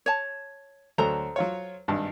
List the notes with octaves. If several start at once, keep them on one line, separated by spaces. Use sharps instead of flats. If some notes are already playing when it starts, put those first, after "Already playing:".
C#5 A5
D2 F#3 A4 C5 A#5
F#3 F4 C#5
G#1 G2 A5